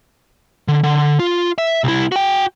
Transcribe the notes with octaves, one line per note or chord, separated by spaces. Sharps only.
D3
D3
F4
E5
C2 E4
F#4 G5